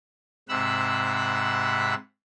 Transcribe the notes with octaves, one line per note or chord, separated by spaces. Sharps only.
G#2 C3 F#5 B5 E6